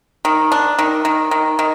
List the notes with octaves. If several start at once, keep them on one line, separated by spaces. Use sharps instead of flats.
D#3
D4
D#3
D#3
D#3
D#3